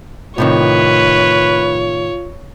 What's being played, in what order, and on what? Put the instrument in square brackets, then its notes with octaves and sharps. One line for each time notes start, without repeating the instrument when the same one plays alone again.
[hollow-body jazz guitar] A2 C3 D#3 [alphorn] F4 [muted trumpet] B4 [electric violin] C#5